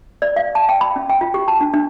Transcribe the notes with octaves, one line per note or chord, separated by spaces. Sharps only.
D5
F5
A5
G5
B5
C#4
G5
F4
G4
A5
D4
D4